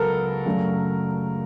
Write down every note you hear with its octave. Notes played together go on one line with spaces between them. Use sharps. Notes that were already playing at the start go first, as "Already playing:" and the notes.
Already playing: C#2 C#3 F#3 B3 A4 A#4
F#2 C#3 F#3 A3 D4